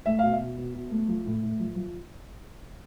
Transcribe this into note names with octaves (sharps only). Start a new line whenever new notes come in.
A3 E5
B2 F5
E5
B2
B2
B2
A3
F3
A2
A2
F3
F3